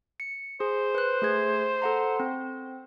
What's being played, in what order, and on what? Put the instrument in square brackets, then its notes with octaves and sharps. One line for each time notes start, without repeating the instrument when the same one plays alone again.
[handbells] C#7
[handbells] G#4 [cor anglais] C5
[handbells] B4 F#6
A3 G#4 G#6
A4 F#5 A#5
C4